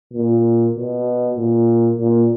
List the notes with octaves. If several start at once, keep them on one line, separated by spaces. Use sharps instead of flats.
A#2
B2
A#2
A#2